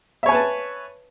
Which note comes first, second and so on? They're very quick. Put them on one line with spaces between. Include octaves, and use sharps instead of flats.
E5 C#5 G#5 B4 A5